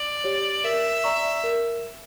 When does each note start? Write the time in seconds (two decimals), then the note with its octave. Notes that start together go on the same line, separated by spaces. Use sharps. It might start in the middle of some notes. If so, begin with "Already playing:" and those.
Already playing: D5
0.24 G4 C#5
0.64 A#4 E5
1.04 D5 A#5 C#6
1.44 A#4